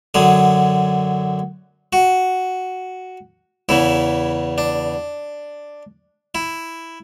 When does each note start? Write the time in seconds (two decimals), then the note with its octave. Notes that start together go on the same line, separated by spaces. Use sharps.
0.14 F#2 D3 F#3 G#4
1.93 F#4
3.69 E2 C#3 E3 E4
4.58 D4
6.35 E4